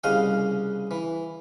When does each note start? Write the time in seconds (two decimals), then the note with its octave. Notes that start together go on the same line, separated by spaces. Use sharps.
0.04 C2 C#3 D#5 F5 F#5 D#6
0.91 E3